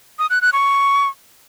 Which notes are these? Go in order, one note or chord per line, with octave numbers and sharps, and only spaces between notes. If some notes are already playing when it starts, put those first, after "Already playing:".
D#6
F#6
F#6
C#6